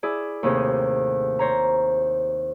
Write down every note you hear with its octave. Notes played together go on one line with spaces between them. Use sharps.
E4 G#4 D5
D#2 A2 C3 G#4
C5 C#5 A#5